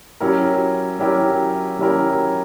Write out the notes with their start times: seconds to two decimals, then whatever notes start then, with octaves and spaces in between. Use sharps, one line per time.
0.20 F#3 C#4 E4 G4 A#4
0.99 F#3 C#4 E4 G4 A#4
1.79 F#3 C#4 E4 G4 A#4